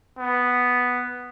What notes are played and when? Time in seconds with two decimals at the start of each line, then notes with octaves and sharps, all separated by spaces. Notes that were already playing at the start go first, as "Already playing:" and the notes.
0.19 B3